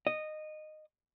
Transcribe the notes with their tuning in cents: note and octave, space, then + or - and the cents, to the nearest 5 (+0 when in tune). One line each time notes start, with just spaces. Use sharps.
D#5 -15